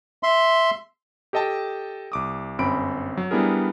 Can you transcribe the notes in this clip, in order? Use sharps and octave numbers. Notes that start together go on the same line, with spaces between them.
E5 C6
G4 A4 D#5 G5 A5
C2 D6 D#6
G1 F#2 C4 B5 D7
F#3
G3 B3 D4 E4 G#4 A#4